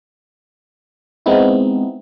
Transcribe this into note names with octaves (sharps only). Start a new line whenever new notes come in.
G#3 B3 C4 D#4 E4